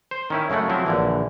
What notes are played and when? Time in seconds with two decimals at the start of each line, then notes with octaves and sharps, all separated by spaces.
0.11 C5
0.30 D#3 C#4 E4
0.50 F#2 C#3 G#3 A3 F#5
0.70 F3 F#3 C4 E4
0.86 A#1 D3 E3